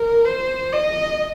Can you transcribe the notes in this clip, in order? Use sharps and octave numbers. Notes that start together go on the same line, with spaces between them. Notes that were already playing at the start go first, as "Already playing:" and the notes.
Already playing: A#4
C5
D#5